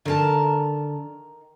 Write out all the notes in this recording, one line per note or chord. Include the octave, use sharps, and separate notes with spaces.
D3 D#3 A#4 A5